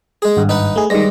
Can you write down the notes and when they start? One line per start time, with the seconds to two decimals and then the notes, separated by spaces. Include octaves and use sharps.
0.22 G#3 G#4
0.37 G#1 G2
0.49 D#4 B4 F#5
0.76 A3 G#4
0.90 G2 D#3 G#3 A#6